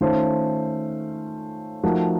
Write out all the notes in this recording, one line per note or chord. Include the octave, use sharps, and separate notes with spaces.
D#3 A3 C#4 F4 C5
F3 A3 D#4 F#4 A#4